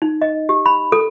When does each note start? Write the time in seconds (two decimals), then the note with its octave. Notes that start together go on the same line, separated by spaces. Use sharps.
0.02 D#4
0.22 D#5
0.49 G4
0.66 B5
0.92 A4